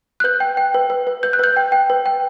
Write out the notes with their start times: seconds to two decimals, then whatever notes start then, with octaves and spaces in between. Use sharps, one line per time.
0.20 F#6
0.24 B4 G6
0.40 G5
0.57 G5
0.74 B4
0.90 B4
1.07 B4
1.23 B4 G6
1.33 F#6
1.39 B4 G6
1.57 G5
1.72 G5
1.90 B4
2.06 G5